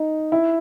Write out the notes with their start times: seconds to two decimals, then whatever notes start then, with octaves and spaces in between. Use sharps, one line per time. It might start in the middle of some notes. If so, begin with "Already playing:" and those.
Already playing: D#4
0.32 E4